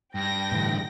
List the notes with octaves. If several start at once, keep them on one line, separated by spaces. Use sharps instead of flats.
G2 G5 A#6
A2 D3 E3